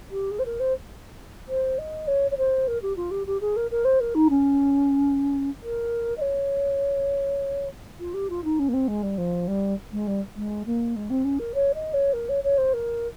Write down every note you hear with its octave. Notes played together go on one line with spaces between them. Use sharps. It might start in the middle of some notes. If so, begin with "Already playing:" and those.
G4
G#4
C5
A#4
C5
C5
D#5
C#5
C#5
C5
A#4
G4
F4
G4
G4
G#4
A#4
A#4
C5
A#4
D#4
C#4
A#4
D#5
C#5
F4
G4
F4
D#4
C#4
A#3
C4
G#3
G3
F3
G3
G#3
G3
G#3
A#3
G#3
C4
C#4
A#4
C#5
D#5
C#5
A#4
C#5
C#5
C5
A#4